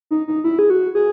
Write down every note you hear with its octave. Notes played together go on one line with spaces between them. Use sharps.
D#4
D#4
E4
G#4
F#4
G#4